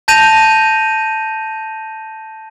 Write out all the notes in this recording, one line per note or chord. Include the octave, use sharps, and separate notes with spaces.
A5 G6 A#6 D#7 F7